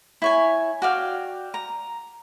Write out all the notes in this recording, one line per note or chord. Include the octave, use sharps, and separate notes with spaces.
E4 C#5 G#5
F#4 D5 F5 G5
A#5